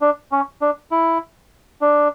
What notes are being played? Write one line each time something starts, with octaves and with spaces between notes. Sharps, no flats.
D4
C#4
D4
E4
D4